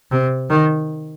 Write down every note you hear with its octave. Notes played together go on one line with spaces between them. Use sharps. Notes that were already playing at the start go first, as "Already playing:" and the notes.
C3
D#3